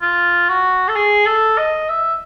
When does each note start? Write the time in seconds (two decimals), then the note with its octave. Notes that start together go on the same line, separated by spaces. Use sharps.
0.02 F4
0.49 F#4
0.88 A4
0.96 G#4
1.26 A4
1.58 D#5
1.89 E5